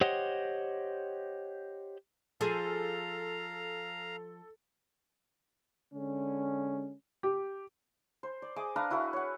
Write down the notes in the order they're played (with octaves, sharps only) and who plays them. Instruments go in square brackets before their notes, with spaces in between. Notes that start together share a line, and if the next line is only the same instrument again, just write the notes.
[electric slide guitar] G4 C5 C#5 D#5 F#5
[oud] F3 G#4 [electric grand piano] A4 [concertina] F5 A#5
[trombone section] D3 G#3 C#4
[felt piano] G4
[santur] C5
D5
G#4 D#5 D6
D4 B4 F5 A#5
E4 F#4 A#4 B4
C#5 F#5